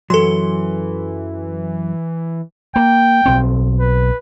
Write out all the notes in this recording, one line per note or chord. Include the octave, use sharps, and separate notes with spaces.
F#2 E3 F#3 A4 C6
A#3 G5
B1 C4
B4